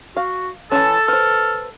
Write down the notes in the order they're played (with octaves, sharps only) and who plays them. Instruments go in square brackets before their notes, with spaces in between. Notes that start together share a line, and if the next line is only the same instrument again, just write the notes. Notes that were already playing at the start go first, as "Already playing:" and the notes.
[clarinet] F#4 [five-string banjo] F5
[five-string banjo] E3 F#3 C#4 [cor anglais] A4 [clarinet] A5
[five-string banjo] B4 C5 [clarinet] F6